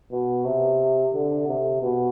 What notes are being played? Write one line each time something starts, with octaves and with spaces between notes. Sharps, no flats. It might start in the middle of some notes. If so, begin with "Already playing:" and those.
B2
C3
D3
C3
B2